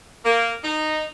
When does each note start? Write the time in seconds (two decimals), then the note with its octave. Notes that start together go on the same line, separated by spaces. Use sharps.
0.25 A#3
0.63 D#4